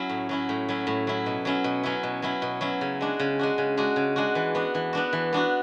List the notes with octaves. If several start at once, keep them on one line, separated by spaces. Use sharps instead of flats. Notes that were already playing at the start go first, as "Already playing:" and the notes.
Already playing: F#3 C#4 E4
A2
F#3 C#4 E4
A2
F#3 C#4 E4
A2
F#3 C#4 E4
B2
F#3 C#4 E4
B2
F#3 C#4 E4
B2
F#3 C#4 E4
B2
F#3 C#4 E4
C#3
G#3 D4 F#4
C#3
G#3 D4 F#4
C#3
G#3 D4 F#4
C#3
G#3 D4 F#4
E3
B3 D4 F#4
E3
B3 D4 F#4
E3
B3 D4 F#4